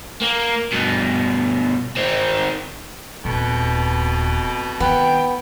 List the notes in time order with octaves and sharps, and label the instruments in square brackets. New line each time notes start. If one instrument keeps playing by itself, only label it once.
[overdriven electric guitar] A#3
G2 B2
D#3 C4
[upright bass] D#1 [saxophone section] F2 B2
[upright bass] D#3 [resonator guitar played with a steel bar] B3 [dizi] G5